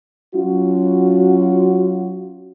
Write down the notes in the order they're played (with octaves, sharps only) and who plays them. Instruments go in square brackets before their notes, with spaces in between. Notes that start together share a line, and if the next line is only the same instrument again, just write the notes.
[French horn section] F#3 C#4 F4 F#4